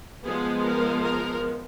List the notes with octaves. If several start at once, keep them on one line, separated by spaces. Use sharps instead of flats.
F3 G#3 B3 G#4
A#4
A#4